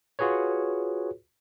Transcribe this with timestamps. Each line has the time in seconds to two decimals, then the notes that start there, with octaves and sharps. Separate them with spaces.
0.19 F4 F#4 G#4 B4 C#5